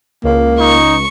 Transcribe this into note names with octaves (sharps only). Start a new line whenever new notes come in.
C#2 A#3
D#4 C#6